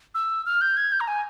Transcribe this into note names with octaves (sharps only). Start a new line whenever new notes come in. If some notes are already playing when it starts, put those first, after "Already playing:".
E6
F6
G6
G#6
G6
A#5
G#5